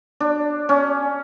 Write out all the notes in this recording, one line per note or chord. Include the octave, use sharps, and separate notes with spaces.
D4
C#4